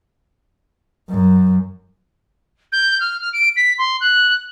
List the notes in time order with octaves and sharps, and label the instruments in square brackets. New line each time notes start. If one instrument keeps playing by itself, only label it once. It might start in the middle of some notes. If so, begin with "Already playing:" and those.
[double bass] F#2
[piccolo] G6
F6
F6
D7
B6
C6
F#6